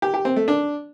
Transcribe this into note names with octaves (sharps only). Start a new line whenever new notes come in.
G4
G4
C4
A3
D4